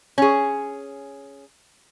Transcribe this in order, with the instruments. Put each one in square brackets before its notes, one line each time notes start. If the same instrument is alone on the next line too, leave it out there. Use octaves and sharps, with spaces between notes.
[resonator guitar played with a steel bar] C#4 G#4